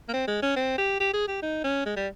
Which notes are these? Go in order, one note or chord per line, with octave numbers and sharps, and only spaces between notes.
A#3
C4
G#3
C#4
C4
G4
G4
G#4
G4
D#4
C#4
G#3
G3